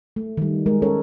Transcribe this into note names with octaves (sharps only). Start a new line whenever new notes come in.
A3
D#3 G3
G#3 G#4 A#4
C#4 A4 A#4 C#5